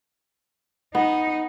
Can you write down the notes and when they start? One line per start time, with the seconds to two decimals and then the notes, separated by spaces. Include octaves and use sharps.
0.95 B3 D#4